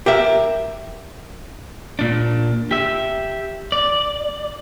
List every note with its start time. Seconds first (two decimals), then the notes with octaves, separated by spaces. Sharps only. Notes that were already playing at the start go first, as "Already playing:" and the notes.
0.06 G4 A#4 E5
1.99 A#2 D4
2.71 G4 E5
3.72 D5